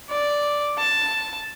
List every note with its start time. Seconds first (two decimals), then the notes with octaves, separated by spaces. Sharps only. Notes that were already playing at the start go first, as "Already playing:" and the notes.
0.10 D5
0.78 A5